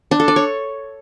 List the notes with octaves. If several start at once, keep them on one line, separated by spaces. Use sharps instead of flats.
D4
A4
D5
C#5